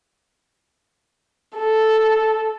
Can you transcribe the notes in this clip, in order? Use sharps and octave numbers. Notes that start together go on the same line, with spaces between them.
A4